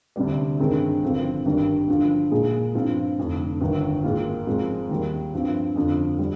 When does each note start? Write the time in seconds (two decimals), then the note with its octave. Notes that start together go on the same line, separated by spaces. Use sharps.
0.16 D2 C3 G3 D4
0.59 G2 D#3 G#3 C4 D#4
1.02 G#1 G2 D3 F3 C4
1.45 G#1 G2 D#3 G3
1.88 G2 D3 F3
2.31 A#2 G#3 D#4 G#4
2.75 G2 F3 C4 F4
3.18 F1 F2 D3
3.61 G1 G2 D#3
4.03 G#2 D#3 A#3 F4
4.47 G#2 F3 G#3 C4
4.89 D#2 D#3 G3
5.33 G2 F3 C4
5.76 F2 D3 F3
6.19 G3